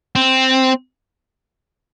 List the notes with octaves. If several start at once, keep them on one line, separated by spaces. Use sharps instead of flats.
C4